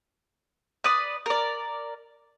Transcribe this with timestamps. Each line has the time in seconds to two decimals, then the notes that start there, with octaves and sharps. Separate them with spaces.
0.84 B4 D5 D#6
1.26 A#4 D5